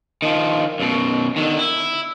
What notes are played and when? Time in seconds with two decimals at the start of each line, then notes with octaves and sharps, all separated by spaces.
0.22 D#3 F3
0.80 F#2 B2
1.36 D3 D#3
1.59 E4